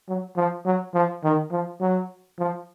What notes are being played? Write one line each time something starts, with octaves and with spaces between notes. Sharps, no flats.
F#3
F3
F#3
F3
D#3
F3
F#3
F3